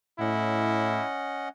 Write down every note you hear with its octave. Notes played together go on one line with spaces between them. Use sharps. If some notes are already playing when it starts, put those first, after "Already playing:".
A2 C#4 E4 D#5 F#5